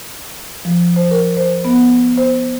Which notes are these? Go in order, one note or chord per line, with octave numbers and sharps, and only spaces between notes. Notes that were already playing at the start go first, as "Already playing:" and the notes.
F3
C5
A#4
C5
B3
C5